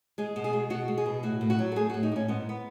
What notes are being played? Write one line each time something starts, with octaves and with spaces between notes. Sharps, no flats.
G#3 G#4
B2
G#4
G#3
B2 F#4
G#3
G#4
B2
A2 F#4
A2
F#4
F#3
A4
A3 G#4
F#4
A2
D#4
A2 C#4
G#2 B3
B3